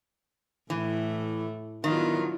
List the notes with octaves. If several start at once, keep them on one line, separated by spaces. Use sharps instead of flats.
A2 E3 A3
D#3 F#3 B3 D4 E4 F4